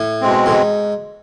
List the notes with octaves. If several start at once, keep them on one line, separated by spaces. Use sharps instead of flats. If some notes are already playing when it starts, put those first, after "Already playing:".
Already playing: A2
B2 G#3 C4
A2
G#2